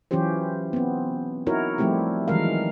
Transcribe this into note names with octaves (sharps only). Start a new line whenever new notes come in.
E3 F#3 C#4 F4 G4 C5
B3 C4
D#4 E4 F#4 A#4 C#5
F3 G3 A3 C4 E4 G4
D#3 E3 F#3 G#3 A#4 F5